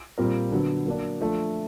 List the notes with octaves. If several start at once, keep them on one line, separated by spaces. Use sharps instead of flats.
A#2 G3 C4 F4 A#4
D3 F#3 B3
F#3 A#3 D4
F3 A3 D4